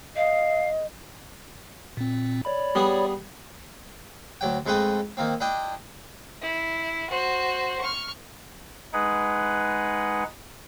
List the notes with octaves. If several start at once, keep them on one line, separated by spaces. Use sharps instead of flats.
D#5 F5
A#2 C4
C#5 D5 B5
G3 B3 G#4
D2 F#3 G5
F2 G#3 A3 B4 D#5 G5
D#3 A#3 C4
D4 E4 D#5 G5
E4
F#4 C5
C#6 F6
G#3 D#4 G#4 B4 F#5